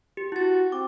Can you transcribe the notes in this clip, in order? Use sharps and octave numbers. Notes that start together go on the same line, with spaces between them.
G4
E4 F#4 A6
C4 D6